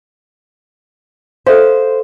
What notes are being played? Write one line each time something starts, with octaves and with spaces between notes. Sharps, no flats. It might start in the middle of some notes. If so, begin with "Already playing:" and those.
A4 C5 E5 F5